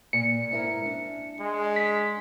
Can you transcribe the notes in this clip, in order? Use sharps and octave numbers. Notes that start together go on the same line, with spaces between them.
A#2 C#7
G#2 E4 A#4
D4
G#3
B6